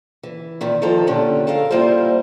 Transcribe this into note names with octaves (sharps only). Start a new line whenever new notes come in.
E3
A#2 D#3 E3
D#3 F3 A4 A#5
A#2 D3 A3 C#4 G4
A4 A#4 F5
G3 A#3 E4 F4 C5